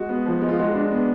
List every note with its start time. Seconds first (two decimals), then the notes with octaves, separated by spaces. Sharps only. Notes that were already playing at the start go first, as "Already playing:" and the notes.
Already playing: G#3 F#4
0.09 B3
0.26 F3
0.42 G#3
0.48 F4
0.59 G#3 F#4
0.75 D4
0.91 B3